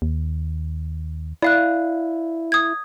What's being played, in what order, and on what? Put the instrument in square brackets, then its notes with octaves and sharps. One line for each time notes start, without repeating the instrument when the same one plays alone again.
[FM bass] D#2
[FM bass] E4 [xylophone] D5 F5 F#6
[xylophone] D#6 G#6